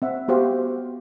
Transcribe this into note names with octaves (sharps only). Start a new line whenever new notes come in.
C4 E5 F#5
B3 F#4 G4 C5 F5